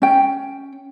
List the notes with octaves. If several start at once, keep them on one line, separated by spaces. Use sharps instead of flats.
C#4 G5